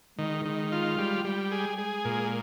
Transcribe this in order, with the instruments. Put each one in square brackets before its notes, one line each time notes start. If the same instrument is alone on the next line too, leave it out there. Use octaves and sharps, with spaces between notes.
[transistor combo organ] D#3 [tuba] G#3
[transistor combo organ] D#3
F4
G3
G3
G#4
[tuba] G#3 [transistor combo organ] G#4
[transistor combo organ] A#2